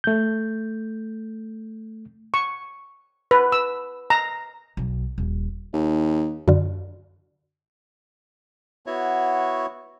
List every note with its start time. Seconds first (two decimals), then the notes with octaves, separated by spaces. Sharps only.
0.04 A3 G6
2.34 C#6
3.31 B4
3.52 E6
4.10 A#5
4.77 B1
5.18 D#1
5.74 D#2
6.48 F#2 D3
8.87 B3 E4 F#4 C#5